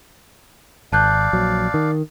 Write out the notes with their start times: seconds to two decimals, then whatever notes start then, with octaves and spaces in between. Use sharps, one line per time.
0.92 G#1 D5 F5 A5 F#6 G6
1.33 A#1 F#3
1.74 D#3